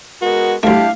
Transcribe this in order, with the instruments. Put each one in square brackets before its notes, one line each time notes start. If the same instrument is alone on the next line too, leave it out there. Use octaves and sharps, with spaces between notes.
[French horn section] G#3 B3 A#4 [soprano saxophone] F#4
[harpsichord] D2 A3 [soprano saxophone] D4 [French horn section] E4 G4 [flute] F5